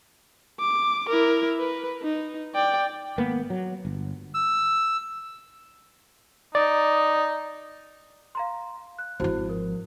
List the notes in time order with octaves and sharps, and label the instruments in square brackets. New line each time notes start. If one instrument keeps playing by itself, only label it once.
[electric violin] D6
E4 A#4
B4
D#4
D5 G5
[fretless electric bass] G#1 A#3 B3
F#3
G1
[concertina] E6
[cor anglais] D#4 [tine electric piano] D5
[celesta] F5 A#5 C6
F#6
[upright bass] G#1 F3 [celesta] E4 F#4 C5
[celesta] A#4